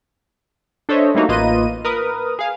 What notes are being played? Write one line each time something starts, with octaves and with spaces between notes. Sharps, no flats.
D4 A4 C5 C#5 D#5 E5
G3 A3 A#3 D#4 F#4
A1 A#3 F4 B4 D#5 D#7
A#4 B4 D#6
G#4 F5